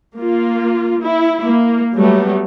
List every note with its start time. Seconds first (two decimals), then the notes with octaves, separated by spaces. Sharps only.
0.17 A#3 F4
1.04 E4
1.43 A#3
1.94 F#3 G3 A3 B3